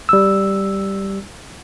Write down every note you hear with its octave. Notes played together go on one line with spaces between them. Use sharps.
G3 E6